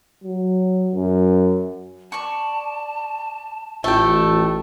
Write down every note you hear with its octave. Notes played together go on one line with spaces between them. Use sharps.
F#3
F#2
D5 A5 C#6
A1 A3 F4 A4 G5